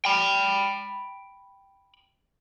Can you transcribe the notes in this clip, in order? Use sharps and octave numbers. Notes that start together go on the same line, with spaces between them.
G5 B5